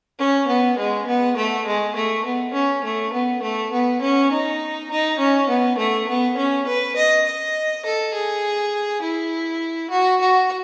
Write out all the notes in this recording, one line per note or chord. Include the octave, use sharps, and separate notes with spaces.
C#4
B3
G#3
B3
A3
G#3
A3
B3
C#4
A3
B3
A3
B3
C#4
D#4
D#4
C#4
B3
A3
B3
C#4
B4
D#5
D#5
A4
G#4
E4
F#4
F#4